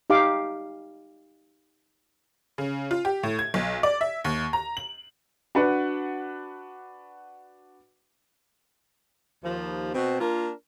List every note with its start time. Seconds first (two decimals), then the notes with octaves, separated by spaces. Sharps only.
0.10 D#4 G4 F5 D6
2.58 C#3
2.91 F4
3.05 G4
3.23 A2
3.39 G#6
3.54 B1
3.83 D5
4.01 E5
4.24 D#2
4.53 A#5
4.77 F#7
5.55 D4 F#4 B4 F#5
9.44 D#2 F3
9.94 B2 C4
10.20 A#3 D4 F4 A#4